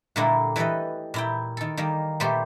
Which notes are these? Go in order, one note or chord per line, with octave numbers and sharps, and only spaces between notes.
A#2 D3 G3 A3 A#3 E4
E3 G3 A4 B4 D#5
A#2 E4 G5
D#3 A4
D#3 G3 A#3
A#2 G3 A3 B3 G4 C5